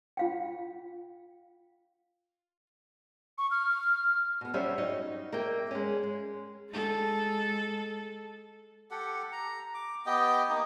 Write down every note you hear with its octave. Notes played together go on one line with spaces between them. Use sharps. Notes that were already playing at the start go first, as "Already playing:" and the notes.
F4 F5 G5
C#6
F6
B2 B3
F#3 G3 C#4 G4 C5 E5
D#4 F#4 C#5 D#5
A#3 E5 G5
G#3 C#4
G#3
G#3 A4
G4 A4 F#5
A#5
D6
B3 G4 D#5 G5
A#3 D#4